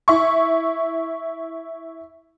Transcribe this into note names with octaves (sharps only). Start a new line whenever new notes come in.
E4 C#6